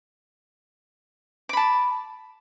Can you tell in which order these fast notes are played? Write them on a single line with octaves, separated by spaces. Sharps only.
D6 B5 A5